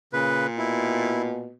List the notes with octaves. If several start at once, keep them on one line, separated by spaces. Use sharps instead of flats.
A#2 C#3 B4
B2 E4